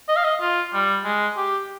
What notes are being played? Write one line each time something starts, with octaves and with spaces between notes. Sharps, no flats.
D#5
F5
D#5
F4
G3
G#3
G4